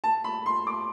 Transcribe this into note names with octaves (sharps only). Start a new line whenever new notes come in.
A5
B5
C6
D6